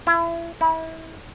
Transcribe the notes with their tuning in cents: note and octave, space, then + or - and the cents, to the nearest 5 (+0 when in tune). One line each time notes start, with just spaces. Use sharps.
E4 +35
E4 -30